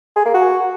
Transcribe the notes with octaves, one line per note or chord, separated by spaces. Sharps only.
G#4
A#3
F#4